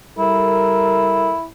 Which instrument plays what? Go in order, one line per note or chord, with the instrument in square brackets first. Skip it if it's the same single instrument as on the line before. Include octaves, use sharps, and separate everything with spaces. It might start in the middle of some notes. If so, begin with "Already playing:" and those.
[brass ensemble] G3 A4 A#4 [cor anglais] E4